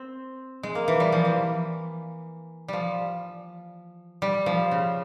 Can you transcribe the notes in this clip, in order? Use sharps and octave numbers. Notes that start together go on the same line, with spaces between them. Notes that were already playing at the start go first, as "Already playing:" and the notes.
Already playing: C4
G#3
A#3
E3
G3
F3
E3
F3 G3
G3
F3
C#3